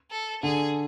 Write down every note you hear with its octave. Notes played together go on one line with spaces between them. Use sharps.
A4
D3 G#4